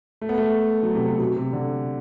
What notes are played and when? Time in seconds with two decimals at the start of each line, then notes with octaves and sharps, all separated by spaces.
0.21 A3
0.29 B3
0.38 A3
0.83 F#3
0.95 C3
1.08 B2
1.20 C3
1.36 C3
1.53 D3